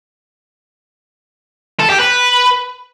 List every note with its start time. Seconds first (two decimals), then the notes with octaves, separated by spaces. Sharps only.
1.80 A4
1.90 G4
1.99 B4